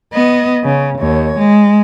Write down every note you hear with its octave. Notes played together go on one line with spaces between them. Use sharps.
B3 D#5
C#3
D#2 C#5
G#3